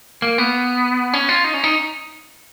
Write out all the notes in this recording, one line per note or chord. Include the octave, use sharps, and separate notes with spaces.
A#3
B3
C#4
F4
D#4
C#4
D#4